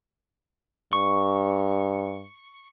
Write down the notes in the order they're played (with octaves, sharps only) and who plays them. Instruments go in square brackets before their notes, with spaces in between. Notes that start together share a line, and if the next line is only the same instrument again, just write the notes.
[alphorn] G2 [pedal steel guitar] C#6